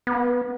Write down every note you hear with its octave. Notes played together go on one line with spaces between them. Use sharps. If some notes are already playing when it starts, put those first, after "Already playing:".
B3